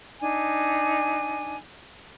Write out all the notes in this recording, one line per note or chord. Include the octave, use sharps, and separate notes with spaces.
D4 D#4 G#5